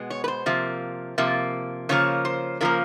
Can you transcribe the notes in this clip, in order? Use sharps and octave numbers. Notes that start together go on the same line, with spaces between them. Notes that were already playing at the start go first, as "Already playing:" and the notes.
Already playing: B2 G#3 B3
C#5
B4
C5
C3 F3 A#3
C3 F3 A#3
C#3 F3 A#3 C#5
C5
C#3 F3 A#3 A#4